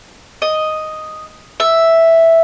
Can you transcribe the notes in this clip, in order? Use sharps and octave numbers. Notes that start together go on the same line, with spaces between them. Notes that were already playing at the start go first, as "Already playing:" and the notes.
D#5
E5